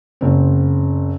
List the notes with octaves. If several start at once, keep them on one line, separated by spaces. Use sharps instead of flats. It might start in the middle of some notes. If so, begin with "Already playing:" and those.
F#1 C4